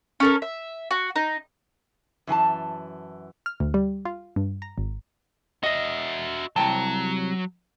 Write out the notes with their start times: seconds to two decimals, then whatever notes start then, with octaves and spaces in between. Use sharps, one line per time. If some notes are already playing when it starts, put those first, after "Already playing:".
0.20 C#4 A4 A#4
0.42 E5
0.91 F#4
1.16 D#4
2.27 F#2 E3 G#5 A5
3.46 F6
3.60 D2
3.74 G3
4.05 F4
4.36 G2
4.62 A#5
4.78 G#1
5.63 F#4 D#5 E5
6.56 C2 F#3 G5 A5